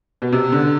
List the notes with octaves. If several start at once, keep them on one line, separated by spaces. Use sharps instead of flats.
B2
C3
D3